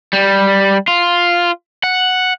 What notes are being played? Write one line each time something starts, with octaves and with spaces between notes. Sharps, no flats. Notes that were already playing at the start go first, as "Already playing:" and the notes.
G3
F4
F#5